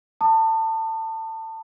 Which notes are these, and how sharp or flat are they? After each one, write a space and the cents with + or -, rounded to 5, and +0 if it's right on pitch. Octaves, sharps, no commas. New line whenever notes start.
A5 +25 D#6 -35